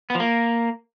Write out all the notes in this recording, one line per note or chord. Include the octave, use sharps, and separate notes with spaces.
B3
F3
A#3